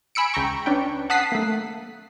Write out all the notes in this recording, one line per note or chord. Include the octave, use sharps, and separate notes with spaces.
G#5 B5 E6 C#7 D7
C#2 G5 A#5 C#6
C#4 D4 B4 G5
F#5 A5 D#6 F#6 B6 C7
A3 A#3